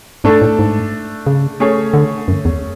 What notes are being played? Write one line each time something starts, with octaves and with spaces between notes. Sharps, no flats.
G#2 A3 D4 A4
A2
G#2
C#3
A3 C#4 G#4 C#5
D3
F#2
E2